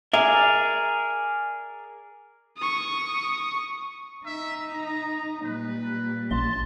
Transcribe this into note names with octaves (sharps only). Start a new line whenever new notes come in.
G#4 A#4 D5 E5
C#6 D#6
D#4 E5
A#5
A#2 G3 B4
A#1 A5 C6